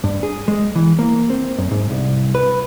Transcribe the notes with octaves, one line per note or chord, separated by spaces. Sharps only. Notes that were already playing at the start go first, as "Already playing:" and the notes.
G2
G#4
G#3
E3
A#3
C4
F#2
G#2
C2
B4